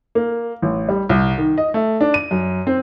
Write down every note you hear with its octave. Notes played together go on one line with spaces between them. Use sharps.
A#3
A1
G3
C2
D#3
D#5
A3
D4
D#7
F#2
C4